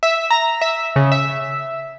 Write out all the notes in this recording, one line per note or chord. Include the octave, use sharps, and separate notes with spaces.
E5
A#5
E5
C#3
E5